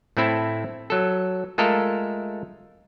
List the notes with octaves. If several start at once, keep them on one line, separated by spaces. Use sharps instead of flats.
A2 A3 C4 E4 A4
F#3 A4
G#3 A3 F4 A4 A#4